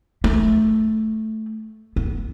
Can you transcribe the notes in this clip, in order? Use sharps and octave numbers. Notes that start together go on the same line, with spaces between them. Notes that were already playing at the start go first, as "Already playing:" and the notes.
A3
B3